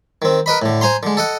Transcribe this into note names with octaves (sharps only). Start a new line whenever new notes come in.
D#3 C4
A#4 B4 D#5 B5
A2 D3
C5 G#5 A#5 C6
D3 G#3
A4 D#5 F#5